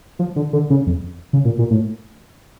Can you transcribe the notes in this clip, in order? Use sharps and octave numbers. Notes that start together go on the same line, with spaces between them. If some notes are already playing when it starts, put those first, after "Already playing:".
F3
D3
D3
C#3
F2
C#3
A#2
A#2
A2